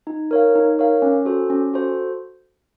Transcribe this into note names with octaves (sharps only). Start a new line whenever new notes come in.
D#4
A#4 C#5 F5
D#4
A#4 C#5 F5
C#4
F#4 A4 C5
C#4
F#4 A4 C5